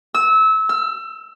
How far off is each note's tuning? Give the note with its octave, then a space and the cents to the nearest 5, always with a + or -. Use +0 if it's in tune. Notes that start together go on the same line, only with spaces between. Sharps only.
E6 -25
E6 +30